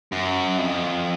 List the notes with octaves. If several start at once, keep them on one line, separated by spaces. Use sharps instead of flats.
F#2
F2